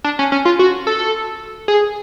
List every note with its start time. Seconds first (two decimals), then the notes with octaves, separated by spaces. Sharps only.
0.04 D4
0.19 C#4
0.32 C#4
0.45 F4
0.59 F#4
0.87 A4
1.68 G#4